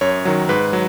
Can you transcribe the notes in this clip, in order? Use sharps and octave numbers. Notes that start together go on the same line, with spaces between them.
F#2 C#5
D#3 F#3
G#2 B4
F#3